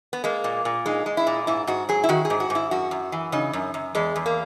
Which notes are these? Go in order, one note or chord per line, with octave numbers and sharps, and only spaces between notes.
B3
G#3 A#3
A#2
A#2
G#3 D#4
G#3
E4
A#2
G#2 E4
G#2 F#4
F#3 G#4
E4
D#3 F#4
G#4
G#2
F#4
G#2
E4
F#2 F#4
F#2
E3
C#3 D#4
F#2
F#2
E2 G#3
E2
A#3